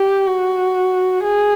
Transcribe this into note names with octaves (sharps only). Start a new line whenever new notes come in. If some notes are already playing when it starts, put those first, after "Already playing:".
Already playing: G4
F#4
G#4